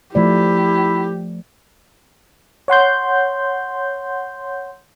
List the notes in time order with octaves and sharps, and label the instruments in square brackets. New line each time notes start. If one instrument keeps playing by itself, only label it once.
[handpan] F3 A3 D5 [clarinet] E4 [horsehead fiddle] G4
[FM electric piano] C#5 F#5 C6 G6